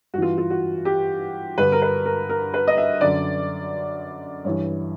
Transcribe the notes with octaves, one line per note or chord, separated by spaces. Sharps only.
G2 E3 F4 F#4
F4
F#4
G4
G2 D3 B4
A#4
B4
A#4
A#4
B4
D#5
E5
F#2 D3 D5
G2 E3 C#5